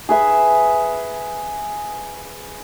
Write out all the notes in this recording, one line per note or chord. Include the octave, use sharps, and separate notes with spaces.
G#4 B4 E5